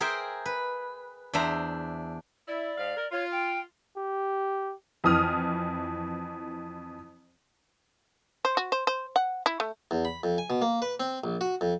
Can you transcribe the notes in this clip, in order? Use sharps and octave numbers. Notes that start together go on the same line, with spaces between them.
G#4 A#4 C5 E5 G5
B4
E2 D4 C5 E5 A#5
E4 D5
G#2 F5
A#4
F4 C#5
G5
G4
F2 E3 D#6 F6
C5
F#4
C5
C5
F#5
E4
A3
E2
B5
F2
G#5
B2
A#3
B4
C4
A#1
F#4
F2